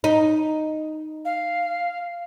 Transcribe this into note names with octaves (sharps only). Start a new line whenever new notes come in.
D#4
F5